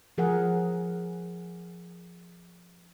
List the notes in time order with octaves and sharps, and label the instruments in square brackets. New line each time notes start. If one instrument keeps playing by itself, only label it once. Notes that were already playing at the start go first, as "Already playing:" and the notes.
[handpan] F3 G#4 A#4 F#5